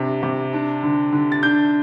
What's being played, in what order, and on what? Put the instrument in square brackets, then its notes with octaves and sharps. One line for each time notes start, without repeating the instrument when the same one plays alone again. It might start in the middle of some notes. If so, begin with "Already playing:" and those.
Already playing: [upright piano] C3 D4
C3
D4
D3
D3
A6
D4 G6